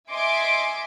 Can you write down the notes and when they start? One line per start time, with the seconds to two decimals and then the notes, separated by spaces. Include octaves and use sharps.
0.12 D#5 E5 G#5 C6 D6 D7